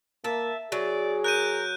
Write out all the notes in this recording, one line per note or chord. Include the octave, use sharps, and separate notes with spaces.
A#3 E5 A5
F#3 G#4 D5
A#4 F#6 G6 D#7